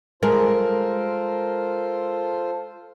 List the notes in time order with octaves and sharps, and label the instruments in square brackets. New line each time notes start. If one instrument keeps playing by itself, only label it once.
[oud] G#3 [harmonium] F4 A4 C5 [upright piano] A#4